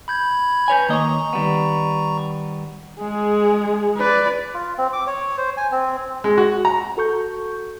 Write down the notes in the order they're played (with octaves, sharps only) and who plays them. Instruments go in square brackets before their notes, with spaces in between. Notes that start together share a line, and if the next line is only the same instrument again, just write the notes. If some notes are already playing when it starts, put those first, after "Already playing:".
[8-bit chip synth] B5 G6 G#6
[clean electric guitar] B4 C#5 G#5
[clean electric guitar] D#3 A#3 D#5 [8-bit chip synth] A#5 C#6
[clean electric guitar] D#3 G3 B3
[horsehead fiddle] G#3 G#4
B4 D5
[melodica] F4
C4
D6
C#5
C5
G#5
C4
[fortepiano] G#3
F#4
A#5
[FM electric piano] F#4 A4 C#6 G6